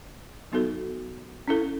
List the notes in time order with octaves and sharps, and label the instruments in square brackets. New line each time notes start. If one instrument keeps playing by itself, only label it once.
[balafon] F#3 B3 D#4 F#4 A4
C#4 E4 A4